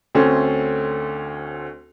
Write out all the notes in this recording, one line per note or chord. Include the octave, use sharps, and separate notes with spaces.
D2 A3 C4 C#4